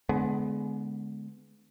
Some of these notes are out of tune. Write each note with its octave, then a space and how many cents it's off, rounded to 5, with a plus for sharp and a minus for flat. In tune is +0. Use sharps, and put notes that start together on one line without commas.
D3 +0 G#3 +30 B3 +20